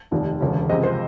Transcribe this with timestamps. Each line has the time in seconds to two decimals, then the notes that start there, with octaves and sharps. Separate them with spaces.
0.11 F1 D#2 D#3
0.41 E1 D2 C#3
0.69 C#2 C3 F3 G#3 D#5
0.83 C5